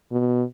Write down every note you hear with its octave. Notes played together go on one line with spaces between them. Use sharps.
B2